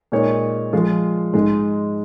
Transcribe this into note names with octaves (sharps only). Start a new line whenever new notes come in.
A#2 G#3 D#4 C#5
F3 G#3 F4
G#2 G#3 D#4